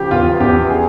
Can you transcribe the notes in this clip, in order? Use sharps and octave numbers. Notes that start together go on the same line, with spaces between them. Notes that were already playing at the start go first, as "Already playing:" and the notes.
Already playing: C#2 F3 G4
E2 F4
E2 G4
G#4